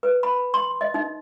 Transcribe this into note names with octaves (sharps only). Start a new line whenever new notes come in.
B4
B5
C6
D#5
D#4